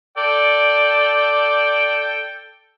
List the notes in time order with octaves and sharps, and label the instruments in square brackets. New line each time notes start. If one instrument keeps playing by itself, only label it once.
[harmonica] A4 D5 G5